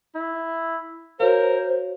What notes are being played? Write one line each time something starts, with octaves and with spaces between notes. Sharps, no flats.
E4
F#4 A#4 C5 C#5 F5